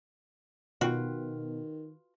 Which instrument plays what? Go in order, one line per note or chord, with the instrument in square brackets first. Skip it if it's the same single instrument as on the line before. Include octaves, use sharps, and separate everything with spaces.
[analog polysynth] B2 [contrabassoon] D#3 [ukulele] F4 B4 G5 [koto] F#4